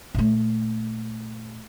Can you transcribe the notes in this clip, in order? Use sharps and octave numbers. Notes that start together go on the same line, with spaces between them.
A#2 A3